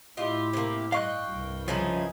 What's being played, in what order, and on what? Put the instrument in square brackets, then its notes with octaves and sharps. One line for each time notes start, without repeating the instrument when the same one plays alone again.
[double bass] A2 E4 [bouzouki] F4 D#5 [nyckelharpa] G4
[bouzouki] C3 A#3
[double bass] G2 [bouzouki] D#5 [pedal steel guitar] F5 C#6 F#6 [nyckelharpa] G5
[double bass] C2 G2
[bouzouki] C#3 E3 D#4 [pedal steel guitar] F3 [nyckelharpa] G#5